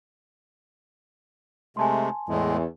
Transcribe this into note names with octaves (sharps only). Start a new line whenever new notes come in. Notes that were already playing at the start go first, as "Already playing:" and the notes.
C3 G#3 A3 G#5 A5 C6
E2 A2 G#3